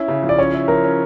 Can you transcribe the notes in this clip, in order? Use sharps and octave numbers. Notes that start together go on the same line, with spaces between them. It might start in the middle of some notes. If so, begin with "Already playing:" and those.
Already playing: C#4 E4 E5
C#3
F3
D5
C#4 C#5
E4
F3 A#4
C#4